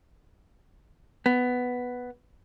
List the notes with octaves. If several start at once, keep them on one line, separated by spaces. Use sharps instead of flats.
B3